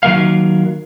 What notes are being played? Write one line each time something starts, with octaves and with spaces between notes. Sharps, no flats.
D#3 F#3 A#3 F5